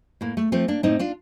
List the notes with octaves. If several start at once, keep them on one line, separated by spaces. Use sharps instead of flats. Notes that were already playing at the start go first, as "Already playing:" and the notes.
A2 A#3
A3
F3 A3 C4
A#3 D4
A2 C4 D#4
D4 F4